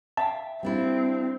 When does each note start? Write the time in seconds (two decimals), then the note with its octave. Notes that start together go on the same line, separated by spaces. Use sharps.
0.17 E5 F5 G5 A5
0.63 G3 C4 D4 E4